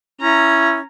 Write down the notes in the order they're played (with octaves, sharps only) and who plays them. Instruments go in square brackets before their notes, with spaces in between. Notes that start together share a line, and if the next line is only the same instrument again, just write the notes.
[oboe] C#4 [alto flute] E4 [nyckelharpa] A#5